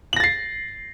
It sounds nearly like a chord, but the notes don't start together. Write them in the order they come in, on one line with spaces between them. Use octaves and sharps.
F#7 A#6 A6 C7